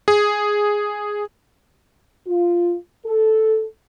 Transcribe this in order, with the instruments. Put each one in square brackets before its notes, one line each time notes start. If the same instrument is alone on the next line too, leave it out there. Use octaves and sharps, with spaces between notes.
[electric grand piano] G#4
[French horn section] F4
A4